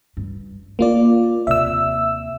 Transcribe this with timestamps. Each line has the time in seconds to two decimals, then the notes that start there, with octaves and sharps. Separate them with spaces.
0.17 G2
0.79 A#3 D4 F4 D5
1.47 D#2 C3 E5 E6